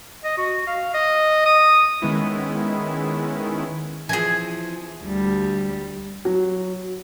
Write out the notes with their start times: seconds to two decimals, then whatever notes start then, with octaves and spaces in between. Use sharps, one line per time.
0.24 D#5
0.38 F#4
0.67 F5
0.94 D#5
1.46 D#6
2.02 D#3 G#3 B3 C#4 E4
4.09 E3 F3 C4 G#4 G#5
5.03 D2 G3
6.25 F#3